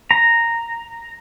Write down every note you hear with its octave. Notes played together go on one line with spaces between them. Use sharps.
A#5